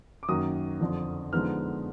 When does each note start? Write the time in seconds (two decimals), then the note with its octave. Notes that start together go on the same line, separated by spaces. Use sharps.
0.23 D6
0.28 F#2 D#3 F#3 A#3 D#6
0.81 F2 D3 F3
1.32 D3 F3 G#3 B3 D#4 F6